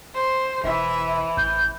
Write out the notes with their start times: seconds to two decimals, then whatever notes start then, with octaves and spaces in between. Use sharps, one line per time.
0.14 C5
0.64 E1 E3 E5
1.37 A1 G6